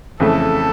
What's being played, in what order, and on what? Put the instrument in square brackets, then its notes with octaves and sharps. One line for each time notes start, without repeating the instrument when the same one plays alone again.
[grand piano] F2 C#3 E3 A3 [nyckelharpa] A4